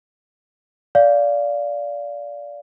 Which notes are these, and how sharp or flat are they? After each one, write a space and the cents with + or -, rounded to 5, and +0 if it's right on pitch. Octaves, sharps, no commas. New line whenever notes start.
D5 -20 F5 +0